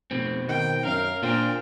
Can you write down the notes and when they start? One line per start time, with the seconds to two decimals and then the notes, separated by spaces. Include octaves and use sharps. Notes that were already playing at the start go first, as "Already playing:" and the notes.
0.11 F1 B2 C4
0.49 D#3 G5
0.85 F#2 A#4 F5
1.23 A#2 D4 G#4 A#4 C5 G5